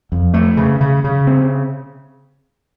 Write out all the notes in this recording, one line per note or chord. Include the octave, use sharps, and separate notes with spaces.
F2
A3
C#3
C#3
C#3
C4